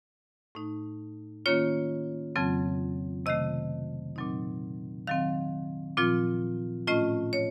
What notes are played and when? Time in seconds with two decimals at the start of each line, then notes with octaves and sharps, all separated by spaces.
0.55 A2 A3 D#4
1.46 D#3 A#3 C#4 F4 C#5
2.36 F2 C#3 F#3 C4
3.26 C3 D#3 A3 D#5
4.16 A#2 F#3 C4 D#4
5.07 D#3 F#3 C4 F5
5.97 A#2 F3 C4 F4
6.87 A2 A3 C#4 F4 D#5
7.33 C#5